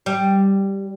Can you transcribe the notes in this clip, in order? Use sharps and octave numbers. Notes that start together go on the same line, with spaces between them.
G3